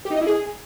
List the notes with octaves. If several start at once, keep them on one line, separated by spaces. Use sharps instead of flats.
G4
D#4
D#5
E4
G#4